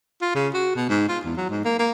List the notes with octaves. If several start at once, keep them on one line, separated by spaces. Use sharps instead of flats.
F4
C#3
F#4
B2
G#2
F4
E2
F#3
G#2
A#3
A#3